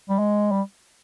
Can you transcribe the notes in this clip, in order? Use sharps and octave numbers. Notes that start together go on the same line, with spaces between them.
G3
G#3
G3